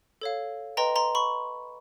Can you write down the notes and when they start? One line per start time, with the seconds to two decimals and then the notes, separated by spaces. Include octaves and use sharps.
0.21 A4 C#5 F5
0.77 B4 D#5 G5 A#5 C6
0.96 A#5 C6
1.15 B5 C#6